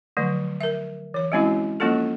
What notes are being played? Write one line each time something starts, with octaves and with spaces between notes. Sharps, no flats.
D3 F3 F#3 A3
A#4 E5
E3 C#5
G3 G#3 C4 C#4 E4 F#4
F3 G3 A#3 C#4 F4 A4